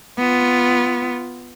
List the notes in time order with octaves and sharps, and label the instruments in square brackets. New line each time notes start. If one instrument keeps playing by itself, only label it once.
[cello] B3 F4